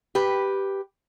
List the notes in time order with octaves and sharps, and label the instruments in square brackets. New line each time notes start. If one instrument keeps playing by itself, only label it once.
[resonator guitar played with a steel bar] G4 B4